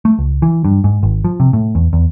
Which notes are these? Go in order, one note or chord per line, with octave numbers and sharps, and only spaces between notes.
A3
C#2
E3
G2
G#2
G#1
F3
C3
A2
E2
E2